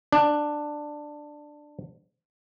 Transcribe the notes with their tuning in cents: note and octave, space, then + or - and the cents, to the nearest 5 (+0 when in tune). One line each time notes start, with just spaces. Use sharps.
D4 +10